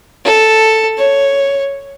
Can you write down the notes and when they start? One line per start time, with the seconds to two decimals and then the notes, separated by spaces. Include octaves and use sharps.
0.25 A4
0.98 C#5